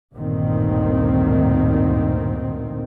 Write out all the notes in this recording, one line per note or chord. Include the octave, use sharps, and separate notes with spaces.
A1 D2 G2 A#2 D#3 C4